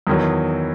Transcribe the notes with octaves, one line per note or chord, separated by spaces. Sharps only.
E2 D#3 F#3